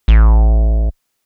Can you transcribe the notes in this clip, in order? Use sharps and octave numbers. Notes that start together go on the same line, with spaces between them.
A1